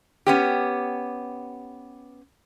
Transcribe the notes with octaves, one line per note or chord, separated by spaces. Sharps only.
B3 C#4 G4